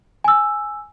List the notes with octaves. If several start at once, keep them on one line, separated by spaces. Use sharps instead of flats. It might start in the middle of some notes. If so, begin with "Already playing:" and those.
G#5 E6